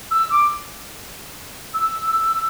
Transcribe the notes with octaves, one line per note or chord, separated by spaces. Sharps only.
E6
D6
E6